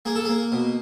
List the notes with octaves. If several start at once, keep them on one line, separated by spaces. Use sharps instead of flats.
A#3 G#4
A4
A#3 G#4
B2